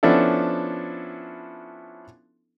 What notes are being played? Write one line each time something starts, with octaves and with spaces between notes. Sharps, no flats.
F3 B3 C#4 D4 E4 A4